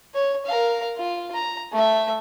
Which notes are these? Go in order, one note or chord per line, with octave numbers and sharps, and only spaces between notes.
C#5
A#4 F5
F4
A#5
A3 E5